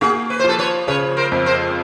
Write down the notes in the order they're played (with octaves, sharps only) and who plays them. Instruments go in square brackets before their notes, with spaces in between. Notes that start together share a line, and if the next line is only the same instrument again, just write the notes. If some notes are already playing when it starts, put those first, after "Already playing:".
[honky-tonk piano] A#3 [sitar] F#4 G#4
[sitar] B4
C5
[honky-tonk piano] F3 [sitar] A4 B4
[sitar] B4 C#5
[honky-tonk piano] C#3 [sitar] B4 C#5
[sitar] A#4 C5
[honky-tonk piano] F2
[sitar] A#4 C5